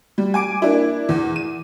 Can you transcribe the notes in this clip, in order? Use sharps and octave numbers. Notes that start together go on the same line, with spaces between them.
G3
G#5 D6 D7
A#3 D4 E4
E2
D#7